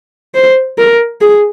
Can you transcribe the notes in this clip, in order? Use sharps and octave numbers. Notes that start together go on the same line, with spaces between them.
C5
A#4
G#4